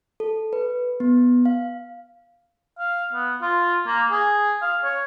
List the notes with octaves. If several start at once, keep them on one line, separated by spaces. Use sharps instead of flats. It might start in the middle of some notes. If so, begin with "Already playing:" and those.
A4
B4
B3
F5
F5
B3
F4
A#3
G#4
F5
C#5